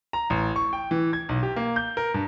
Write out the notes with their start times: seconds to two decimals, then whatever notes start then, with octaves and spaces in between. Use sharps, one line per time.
0.13 A#5
0.30 A1
0.56 C#6
0.73 G5
0.91 E3
1.13 G#6
1.29 B1
1.43 G4
1.56 A#3
1.76 G6
1.97 A#4
2.14 G2